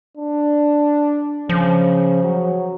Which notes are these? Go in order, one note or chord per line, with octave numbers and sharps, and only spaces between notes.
D4
C#3 F3
F#3